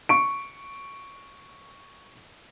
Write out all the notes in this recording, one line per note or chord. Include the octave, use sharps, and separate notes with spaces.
C#6 D7